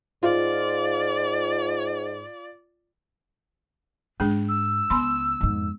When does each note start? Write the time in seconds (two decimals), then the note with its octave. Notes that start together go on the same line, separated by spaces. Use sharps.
0.23 G#2 F4 D5
4.20 G#2 G#3 D4 G#4
4.48 E6
4.90 C#2 C#3 B3 B5 C6
5.41 F2 G#2